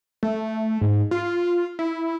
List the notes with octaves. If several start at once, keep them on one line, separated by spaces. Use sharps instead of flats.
A3
G#2
F4
E4